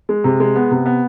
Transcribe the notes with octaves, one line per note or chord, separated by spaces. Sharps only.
G#3
C3
G#3
B3
C3
B3